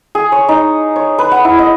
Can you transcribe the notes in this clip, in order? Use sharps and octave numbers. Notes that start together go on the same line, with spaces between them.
G#4
C#5
D#4
C#5
B4
F#5
E4
D#5